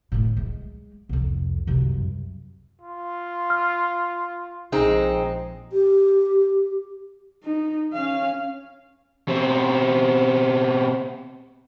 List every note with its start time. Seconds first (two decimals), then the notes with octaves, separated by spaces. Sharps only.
0.12 A2 A3
0.37 G#3
1.09 C2 F2
1.67 C2 F#2
2.82 F4
3.50 F6
4.72 A#1 G#3 C4 D#4
5.72 G4
7.44 D#4
7.93 C#4 F5
9.28 B2 C4